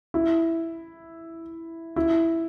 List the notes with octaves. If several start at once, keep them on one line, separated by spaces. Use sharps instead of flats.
E4
E4